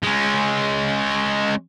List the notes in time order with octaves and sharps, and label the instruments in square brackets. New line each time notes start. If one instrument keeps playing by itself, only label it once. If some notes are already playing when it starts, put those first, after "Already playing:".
[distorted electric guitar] G#3 C#4